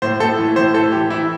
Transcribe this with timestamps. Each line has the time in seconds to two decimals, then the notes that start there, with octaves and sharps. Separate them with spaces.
0.02 A2 C5
0.20 A2 A4
0.39 E3
0.56 A2 C5
0.74 E3 A4
0.92 E3 G4
1.10 E3 E4